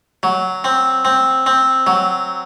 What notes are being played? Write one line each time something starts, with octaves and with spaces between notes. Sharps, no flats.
F#3
C4
C4
C4
F#3